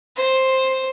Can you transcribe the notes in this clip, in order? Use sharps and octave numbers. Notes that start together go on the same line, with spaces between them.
C5